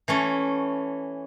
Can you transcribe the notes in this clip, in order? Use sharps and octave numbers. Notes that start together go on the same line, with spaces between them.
E3 A3 C#4